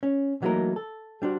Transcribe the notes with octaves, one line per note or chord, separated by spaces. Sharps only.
C#4
E3 F#3 A3 A#3 D#4 A#4
A4
G3 D4 F#4 C5